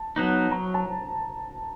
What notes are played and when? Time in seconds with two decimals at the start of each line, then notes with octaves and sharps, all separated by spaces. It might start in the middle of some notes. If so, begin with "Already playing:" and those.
Already playing: A5
0.16 F#3 B3 D#4
0.51 F#3 A#5
0.74 A5